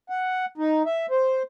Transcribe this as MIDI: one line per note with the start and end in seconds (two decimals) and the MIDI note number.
0.10 0.46 78
0.58 0.83 63
0.86 1.06 76
1.11 1.43 72